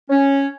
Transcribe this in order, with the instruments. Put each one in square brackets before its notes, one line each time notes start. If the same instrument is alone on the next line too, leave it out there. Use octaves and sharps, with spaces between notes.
[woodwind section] C#4